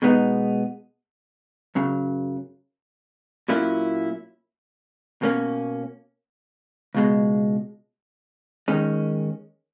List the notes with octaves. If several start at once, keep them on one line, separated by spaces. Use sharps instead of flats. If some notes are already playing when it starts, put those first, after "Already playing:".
B2 G#3 B3 D#4
F#2 C#3 F#3
A#2 F#3 A#3 C#4 E4
B2 A#3 C#4
C#2 B2 G#3
D#2 D#3 G#3 C#4